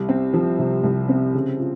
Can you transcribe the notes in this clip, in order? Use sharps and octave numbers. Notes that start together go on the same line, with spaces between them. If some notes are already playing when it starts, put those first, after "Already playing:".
Already playing: C2
C4
F3
C3
C2
C4
C#3
F4